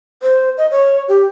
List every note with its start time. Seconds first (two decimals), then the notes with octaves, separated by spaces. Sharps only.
0.23 C5
0.58 D#5
0.71 C#5
1.08 G4